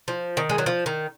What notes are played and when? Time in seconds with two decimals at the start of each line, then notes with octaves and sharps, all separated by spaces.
0.08 F3
0.37 D#3
0.50 G#3
0.58 F#3
0.66 F3
0.86 D#3